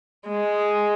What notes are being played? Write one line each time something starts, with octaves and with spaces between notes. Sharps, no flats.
G#3